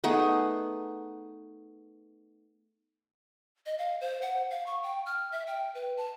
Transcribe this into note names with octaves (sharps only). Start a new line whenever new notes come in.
A3 B3 D#4 G#4
D#5
F5
C5
F#5
F5
C#6
G5
F6
E5
G5
B4
A5